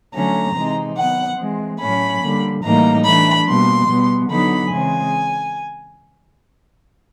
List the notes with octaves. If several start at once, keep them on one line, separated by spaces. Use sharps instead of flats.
D3 F#3 A3 C#4 A#5
C3 E3 G#3 C4 D#4
D#3 F#3 B3 F#5
E3 G#3 C4
A2 F#3 A3 C#4 B5
D3 G3 A#3
A2 E3 G3 A#3 D#4 A#5
E3 A3 D4 B5
B2 G3 A#3 C6
B2 G3 B3
D3 F#3 B3 D#4 B5
C#3 E3 G#3 C4 G#5